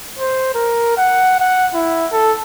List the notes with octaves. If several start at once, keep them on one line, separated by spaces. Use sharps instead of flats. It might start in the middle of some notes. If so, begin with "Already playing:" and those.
C5
A#4
F#5
F#5
E4
A4